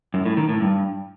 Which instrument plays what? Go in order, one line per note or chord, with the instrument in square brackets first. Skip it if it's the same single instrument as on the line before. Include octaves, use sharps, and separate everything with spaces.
[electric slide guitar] F#2
A2
D#3
A2
G2